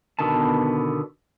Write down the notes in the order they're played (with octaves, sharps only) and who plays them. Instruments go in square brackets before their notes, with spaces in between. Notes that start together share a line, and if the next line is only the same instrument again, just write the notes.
[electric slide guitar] B2 D3 D#3 B3 A5